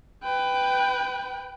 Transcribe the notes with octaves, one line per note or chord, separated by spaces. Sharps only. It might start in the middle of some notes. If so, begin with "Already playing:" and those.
B4 G5